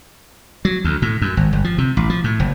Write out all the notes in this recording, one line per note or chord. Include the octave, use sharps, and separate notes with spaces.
F#3
D2
A2
F#2
G#1
G1
F3
C3
A1
F3
A2
F#1